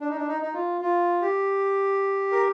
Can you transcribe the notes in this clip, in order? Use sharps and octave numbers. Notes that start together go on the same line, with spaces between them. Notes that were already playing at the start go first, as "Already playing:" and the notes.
D4
D#4
D4
D#4
D#4
F4
F4
G4
A#4